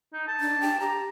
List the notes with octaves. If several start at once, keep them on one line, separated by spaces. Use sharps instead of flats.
D#4
A5
D4
G5
G4 A#5